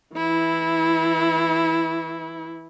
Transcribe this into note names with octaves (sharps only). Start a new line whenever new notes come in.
E3 E4